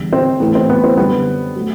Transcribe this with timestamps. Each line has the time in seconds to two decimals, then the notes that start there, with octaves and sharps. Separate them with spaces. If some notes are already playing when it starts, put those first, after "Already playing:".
Already playing: E2 D3 G3
0.13 C4
0.40 A2 E3 A3 B3
0.55 C4
0.69 B3
0.84 C4
0.97 F#2 D3 G3 B3
1.56 F#3 A3